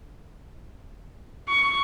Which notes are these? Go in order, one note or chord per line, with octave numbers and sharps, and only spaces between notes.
C#6